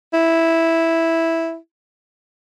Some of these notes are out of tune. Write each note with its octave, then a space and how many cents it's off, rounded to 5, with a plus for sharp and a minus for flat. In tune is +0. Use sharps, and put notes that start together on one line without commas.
E4 -5